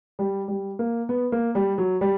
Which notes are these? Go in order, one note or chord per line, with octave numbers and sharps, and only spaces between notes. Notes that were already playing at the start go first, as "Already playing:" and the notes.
G3
G3
A#3
B3
A#3
G3
F#3
G3